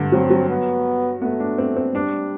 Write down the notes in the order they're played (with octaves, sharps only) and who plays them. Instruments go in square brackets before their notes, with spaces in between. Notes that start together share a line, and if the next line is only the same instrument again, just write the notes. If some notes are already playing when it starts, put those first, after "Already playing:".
Already playing: [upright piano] G2 D3
[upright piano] F#3 [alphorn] C4
[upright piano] F#3
[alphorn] B3
[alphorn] A3 [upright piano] B3
[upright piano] D4
C4
C4
[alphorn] G3 [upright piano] D4